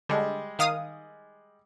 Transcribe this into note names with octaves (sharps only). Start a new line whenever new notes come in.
D3 G3 G#3
D#3 F5 D#6